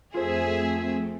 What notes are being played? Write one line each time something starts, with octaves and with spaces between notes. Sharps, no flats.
F2 A3 C4 F4 G#4 A4 C5 E5